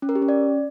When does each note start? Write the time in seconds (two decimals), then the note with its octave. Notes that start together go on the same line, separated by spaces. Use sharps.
0.02 C#4
0.09 A#4
0.15 G4
0.22 C#4
0.29 D5